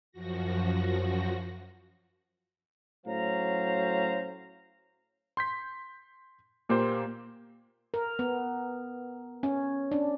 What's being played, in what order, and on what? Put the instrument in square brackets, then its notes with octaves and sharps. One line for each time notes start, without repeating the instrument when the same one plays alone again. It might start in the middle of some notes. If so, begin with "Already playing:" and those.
[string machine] F#2 F3 F#4 A#6
[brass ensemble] A2 F#3 C#4 C5 F5 A#5
[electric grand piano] C6 G6 B6
A#2 A#3 G4 C5
[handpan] A#4
B3
C#4
D4